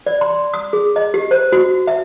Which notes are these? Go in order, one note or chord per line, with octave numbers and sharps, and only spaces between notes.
D5
C6
D#6
G#4
D#5
G4
C5
F#4
E5